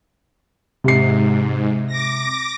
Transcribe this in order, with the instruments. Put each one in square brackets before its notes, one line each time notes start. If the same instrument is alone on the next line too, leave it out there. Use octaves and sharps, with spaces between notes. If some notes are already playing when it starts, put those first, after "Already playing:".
[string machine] G#2 [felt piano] C3 C7
[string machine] D6 A#6